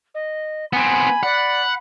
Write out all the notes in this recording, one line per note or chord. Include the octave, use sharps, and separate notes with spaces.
D#5
B3 C4 G#5 B5
D5 F#5